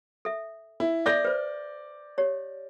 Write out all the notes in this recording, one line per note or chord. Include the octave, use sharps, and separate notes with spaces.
A4 E5
E4
A4 D5 E5 G6 A#6
B4 C5
G4 C#5